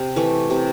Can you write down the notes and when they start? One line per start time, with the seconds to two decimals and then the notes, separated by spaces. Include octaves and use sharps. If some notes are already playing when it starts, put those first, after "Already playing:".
Already playing: C3
0.16 E3 A3
0.50 C3